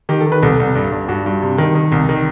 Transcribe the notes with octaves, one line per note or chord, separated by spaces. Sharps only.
D#3 G4
A4
D#3
B4
C2 A4
C2
G2
G2
G2 F#4
G2
C3
D#3
D#3
C2
D#3